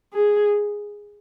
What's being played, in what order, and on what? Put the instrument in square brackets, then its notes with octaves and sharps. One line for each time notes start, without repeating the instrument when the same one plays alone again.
[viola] G#4